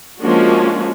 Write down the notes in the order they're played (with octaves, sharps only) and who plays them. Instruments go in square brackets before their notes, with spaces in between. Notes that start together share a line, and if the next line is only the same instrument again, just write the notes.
[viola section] F3 G#3 A#3 C#4 D4 F#4